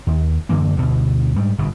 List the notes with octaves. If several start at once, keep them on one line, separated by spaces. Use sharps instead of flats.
D#2
F#2 D3 E3 A#3
D2 B2 D3
G#2 G3
G1 G#2 B2